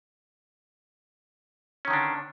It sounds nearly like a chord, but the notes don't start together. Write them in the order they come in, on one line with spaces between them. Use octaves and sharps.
C#4 D#3 D3 D4